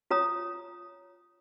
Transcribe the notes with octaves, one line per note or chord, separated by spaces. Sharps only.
F4 C#5 A#5 D#6